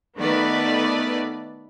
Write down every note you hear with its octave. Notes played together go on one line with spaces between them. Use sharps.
D#3 A3 B3 B4 D5